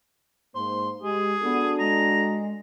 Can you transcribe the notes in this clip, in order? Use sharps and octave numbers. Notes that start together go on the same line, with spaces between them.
G#2 A#3 C5 C6
G#3 G4 G#4
B3 D4 F#4 A4
G#3 A#5